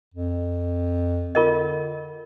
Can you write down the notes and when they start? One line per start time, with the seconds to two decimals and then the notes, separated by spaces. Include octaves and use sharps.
0.14 F2
1.35 D3 F4 A#4 D#5